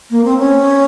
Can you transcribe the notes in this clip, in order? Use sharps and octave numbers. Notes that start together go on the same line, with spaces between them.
A#3
C4
C#4